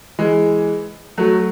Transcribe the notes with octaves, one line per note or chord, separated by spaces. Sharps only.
E3 G#3
F#3 A3